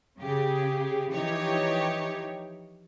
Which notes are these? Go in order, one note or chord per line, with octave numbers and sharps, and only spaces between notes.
C#3 G4 G#4
E3 F3 D#4 G4 C#5